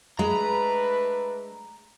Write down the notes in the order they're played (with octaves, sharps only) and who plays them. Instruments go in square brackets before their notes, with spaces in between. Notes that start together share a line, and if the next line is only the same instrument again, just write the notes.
[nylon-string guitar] G#3 [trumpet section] A3 D4 B4 [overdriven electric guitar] A#5